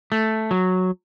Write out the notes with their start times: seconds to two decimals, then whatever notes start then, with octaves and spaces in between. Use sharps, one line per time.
0.12 A3
0.51 F#3